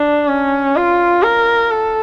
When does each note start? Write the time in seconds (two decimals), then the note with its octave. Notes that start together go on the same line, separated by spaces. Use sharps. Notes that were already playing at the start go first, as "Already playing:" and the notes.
Already playing: D4
0.28 C#4
0.76 F4
1.23 A#4
1.71 A4